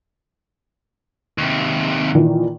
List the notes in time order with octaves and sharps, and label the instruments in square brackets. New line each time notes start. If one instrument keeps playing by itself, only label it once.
[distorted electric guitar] D#2 C3
[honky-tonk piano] A#2 D#3 E3